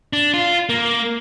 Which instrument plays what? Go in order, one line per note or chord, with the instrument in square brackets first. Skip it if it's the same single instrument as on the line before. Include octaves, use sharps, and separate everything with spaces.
[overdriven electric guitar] D4
F4
A#3